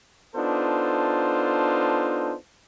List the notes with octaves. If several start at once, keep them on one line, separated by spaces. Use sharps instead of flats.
B3 D4 D#4 F4 A4 C5